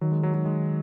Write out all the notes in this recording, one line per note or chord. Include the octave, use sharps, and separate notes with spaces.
D#3 F#3
G#3
F#3
F#3
G#3